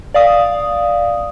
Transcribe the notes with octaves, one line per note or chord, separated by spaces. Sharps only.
D5 F5 D#6